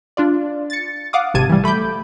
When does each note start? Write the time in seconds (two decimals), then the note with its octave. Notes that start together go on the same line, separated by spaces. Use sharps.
0.17 D4 F4 D5
0.70 A6 C#7
1.13 F5 F#5 D6 D#6
1.34 G#1 C3 A5 G#6 D#7
1.49 E3 G3
1.63 A3 B5 D6 G6